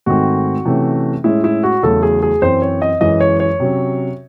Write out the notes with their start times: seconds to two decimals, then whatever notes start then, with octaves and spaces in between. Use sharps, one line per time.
0.06 G#2 D#3 A3 C4 F#4
0.65 C3 E3 A3 C#4
1.24 A2 G#3 C#4 E4
1.44 E4
1.63 F#4
1.83 E2 C#3 F#3 A3 A4
2.03 G#4
2.23 G#4
2.42 F#2 E3 C4 C5
2.62 C#5
2.82 D#5
3.01 F#2 E3 G#3 D#5
3.20 C#5
3.40 C#5
3.60 C3 F#3 C#4